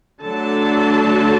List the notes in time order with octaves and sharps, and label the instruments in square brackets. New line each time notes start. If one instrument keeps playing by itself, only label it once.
[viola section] D3 F#3 A3 D4 A4 A5